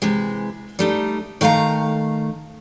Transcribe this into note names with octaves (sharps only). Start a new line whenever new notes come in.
C3 E3 G#3
G3 A3 D#4
D#3 A3 F5 G5 A#5